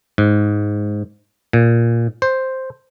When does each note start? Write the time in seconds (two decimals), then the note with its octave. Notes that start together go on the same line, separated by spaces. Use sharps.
0.18 G#2
1.53 A#2
2.22 C5